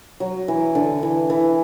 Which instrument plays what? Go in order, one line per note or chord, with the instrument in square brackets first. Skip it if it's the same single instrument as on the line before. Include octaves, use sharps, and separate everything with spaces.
[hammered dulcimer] F#3
E3
D3
E3
E3